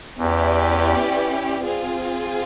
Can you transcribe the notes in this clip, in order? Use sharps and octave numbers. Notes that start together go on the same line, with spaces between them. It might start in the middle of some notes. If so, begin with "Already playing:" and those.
E2 C#4 E4 G4 B4 D5
C4 F4 G#4